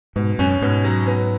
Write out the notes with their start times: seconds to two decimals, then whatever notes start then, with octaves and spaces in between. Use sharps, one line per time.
0.16 G#2 B2
0.39 F#2 C#4
0.62 G#2 B2
0.85 F#3
1.07 B3